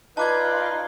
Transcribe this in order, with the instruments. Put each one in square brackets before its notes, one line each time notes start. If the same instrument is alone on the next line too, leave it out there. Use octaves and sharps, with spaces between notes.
[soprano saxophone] D#4 [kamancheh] F4 D5 [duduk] B4 [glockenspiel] A5 D6 G#6